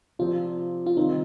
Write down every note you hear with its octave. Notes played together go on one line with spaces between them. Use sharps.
C3 F3 C4 F4 G4 D5
F4
C3 D#3 G3 C4 D#4 F4